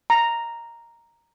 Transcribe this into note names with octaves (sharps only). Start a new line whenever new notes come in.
A#5